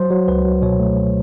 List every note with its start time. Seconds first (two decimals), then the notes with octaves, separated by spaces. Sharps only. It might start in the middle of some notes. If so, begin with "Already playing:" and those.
Already playing: F#3 C5
0.10 F#3
0.28 C#2 B4
0.45 F#3
0.62 B2 C#5
0.80 A3